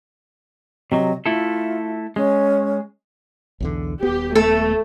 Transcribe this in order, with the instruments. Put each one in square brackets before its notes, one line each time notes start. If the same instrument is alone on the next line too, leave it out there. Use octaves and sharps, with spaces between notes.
[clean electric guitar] C3 F#3 [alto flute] D#5
[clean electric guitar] A3 E4 A4 [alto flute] F4
[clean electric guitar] G#3 [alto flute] C#4
[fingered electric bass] B1 E2 D3
[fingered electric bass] D#1 B3 [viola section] G4
[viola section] A3 [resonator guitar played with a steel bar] A4